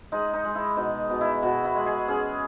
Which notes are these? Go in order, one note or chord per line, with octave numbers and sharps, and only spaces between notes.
G#3 D#4
D#4
G#3
E4
B2 D#4
B2
E4
B2 F#4
E4
G#3
G#4
C#4 G#4